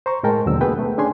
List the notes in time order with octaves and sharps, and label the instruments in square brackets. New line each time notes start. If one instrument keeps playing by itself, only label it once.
[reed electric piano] C5 A#5 C#6
A2 G#3 A#4 G5 A5
D#2 B2 D3 F#3 E6
A3 B3 G#4 B4 G5
A3
C#4 D4 G#4 G#5 C6